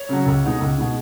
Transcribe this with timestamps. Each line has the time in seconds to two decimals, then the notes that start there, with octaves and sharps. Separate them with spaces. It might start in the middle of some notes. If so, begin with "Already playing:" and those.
Already playing: C#5
0.09 C#3 F#3
0.26 C#2
0.44 B2 G#3 D#4
0.60 C#2
0.78 B2 G#3 D#4